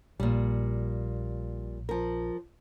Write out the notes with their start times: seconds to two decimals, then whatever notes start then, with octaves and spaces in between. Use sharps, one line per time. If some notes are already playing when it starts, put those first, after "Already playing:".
0.20 A#1 A#2 G3
1.89 F3 A#4